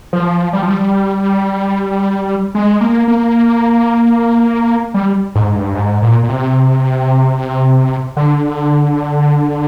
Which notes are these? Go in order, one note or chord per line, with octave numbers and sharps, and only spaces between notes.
F3
G3
F3
G3
G#3
A#3
A#3
G3
G#2
G2
G#2
A#2
A#2
C3
D3